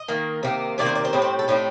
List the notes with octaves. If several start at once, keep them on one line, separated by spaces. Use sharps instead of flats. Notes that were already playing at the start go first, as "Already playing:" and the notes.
Already playing: D#5
D#3 A#3
C3 D#3 A#3
C3 D#3 A#3 D5
C5
D5
C5
A2 G3 C4 D#5
C5
A4
A2 G3 C4 D#4